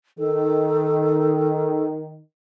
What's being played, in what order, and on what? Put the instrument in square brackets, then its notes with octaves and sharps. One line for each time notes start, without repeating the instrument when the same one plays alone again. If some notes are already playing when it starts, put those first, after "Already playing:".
[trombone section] D#3 [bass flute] A4